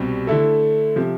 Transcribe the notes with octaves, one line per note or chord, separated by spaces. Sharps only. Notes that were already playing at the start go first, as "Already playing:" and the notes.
Already playing: C2 B2 G3 C4
D3 A3 E4 A4
C3 F3